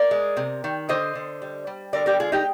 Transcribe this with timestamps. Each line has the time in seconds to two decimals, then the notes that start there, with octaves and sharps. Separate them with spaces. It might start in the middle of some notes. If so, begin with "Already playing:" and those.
Already playing: A#4 D5
0.11 G#3
0.37 C3
0.64 D#3
0.89 D3 C5 D#5
1.15 D3
1.42 G3
1.67 G3
1.93 D3 A#4 D5
2.06 G4 A#4
2.20 G#3 F4 G#4
2.32 D#4 G4